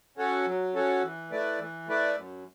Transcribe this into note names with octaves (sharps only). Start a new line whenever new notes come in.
C#4 F#4 A4 C#5
F#3
C#4 F#4 A4 C#5
E3
A3 E4 B4 D5
E3
A3 E4 B4 D5
F#2